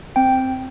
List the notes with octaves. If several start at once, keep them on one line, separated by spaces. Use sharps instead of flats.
C4 G5